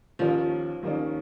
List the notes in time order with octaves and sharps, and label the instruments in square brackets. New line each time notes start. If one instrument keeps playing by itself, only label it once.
[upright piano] D#2 D#3 A#3 C#4 [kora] F3
[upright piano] D#2 D#3 A#3 C#4